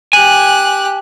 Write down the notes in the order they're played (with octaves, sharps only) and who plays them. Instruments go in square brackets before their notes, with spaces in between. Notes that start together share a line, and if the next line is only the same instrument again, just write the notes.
[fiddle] G4 F#6 [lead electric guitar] G#5